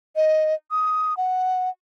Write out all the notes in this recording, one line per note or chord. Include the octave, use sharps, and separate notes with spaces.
D#5
D#6
F#5